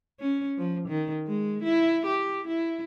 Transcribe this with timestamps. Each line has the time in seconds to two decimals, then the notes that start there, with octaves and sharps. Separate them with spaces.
0.20 C#4
0.58 F3
0.88 D#3
1.27 G#3
1.63 E4
2.06 G4
2.47 E4